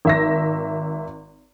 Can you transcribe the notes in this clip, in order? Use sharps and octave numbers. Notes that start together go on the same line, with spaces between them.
G#1 E5 A#6